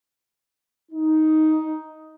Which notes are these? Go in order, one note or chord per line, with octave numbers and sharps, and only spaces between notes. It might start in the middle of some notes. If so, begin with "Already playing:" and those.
D#4